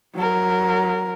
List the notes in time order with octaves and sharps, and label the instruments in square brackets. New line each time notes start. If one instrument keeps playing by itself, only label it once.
[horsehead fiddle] F#3 A#4